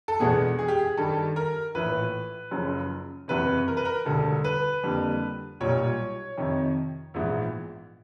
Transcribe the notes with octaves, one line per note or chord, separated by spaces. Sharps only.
A4
E2 B2 G#3 B3 D4 G#4
G#4
G4
G#4
G2 D#3 G3 A4
A#4
A#1 A2 E3 B4
F#1 F#2 C#3 F3
F#1 E2 C3 B4
A#4
B4
A#4
E1 D2 D3 G3 A4
B4
F2 D3 G3 A#3 D4
B1 A#2 G3 C#5
F2 C3 D#3
A#1 G#2 E3 G#3 B3